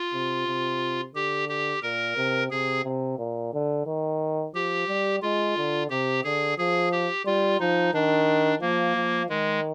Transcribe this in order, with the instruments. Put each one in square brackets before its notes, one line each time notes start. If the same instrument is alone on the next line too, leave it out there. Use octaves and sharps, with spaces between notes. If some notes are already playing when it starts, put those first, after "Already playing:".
Already playing: [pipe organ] F4
[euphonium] C3
C3
[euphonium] D3 [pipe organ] G4
[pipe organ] G4
[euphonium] A#2 [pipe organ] A#4
[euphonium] C3
[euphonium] C3 [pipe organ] G#4
[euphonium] C3
A#2
D3
D#3
[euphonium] F3 [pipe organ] G4
[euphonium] G3
[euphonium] G#3 [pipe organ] F4
[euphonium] D3
[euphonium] C3 [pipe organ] G4
[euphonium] D3 [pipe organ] G#4
[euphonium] F3 [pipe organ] G#4
[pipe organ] G4
[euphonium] G3 [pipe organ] F4
[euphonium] F3 [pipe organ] D#4
[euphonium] D#3 [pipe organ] D4
[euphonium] F3 [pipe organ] A#3
[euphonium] F3
[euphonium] D#3 [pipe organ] G#3